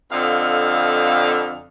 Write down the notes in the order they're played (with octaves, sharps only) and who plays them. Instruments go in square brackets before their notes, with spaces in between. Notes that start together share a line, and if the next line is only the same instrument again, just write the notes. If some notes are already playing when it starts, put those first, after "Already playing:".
[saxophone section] F2 D3 D#5 F5